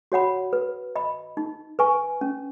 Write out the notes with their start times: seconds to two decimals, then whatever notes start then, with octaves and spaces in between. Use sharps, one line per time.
0.12 F#4 C#5 F#5 B5
0.53 B4
0.96 D#5 B5
1.37 D#4
1.79 B4 G#5 C#6
2.21 C#4